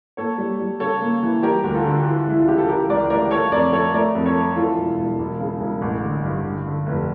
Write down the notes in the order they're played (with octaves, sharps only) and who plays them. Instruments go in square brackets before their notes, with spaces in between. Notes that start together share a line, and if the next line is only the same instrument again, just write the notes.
[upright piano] A#3 A4 C#5
G3
G3
C#3 A4 C#5
A#3
E3
G3 G4 A#4
D2
F4 A4
D3
E3
C#2 E4
F4
C#3 G4
A4
E3 G4 A#4
C#2 A#4 D5
A3 A#4 D5
A3 A4 C#5
F2 A#4 D5
A3 A4 C#5
A3 A#4 D5
F2
A4 C#5
A3
E3 F4 A4
E1
E1
E1
C#3
E1
A1
D3
G2
D3
D3
F1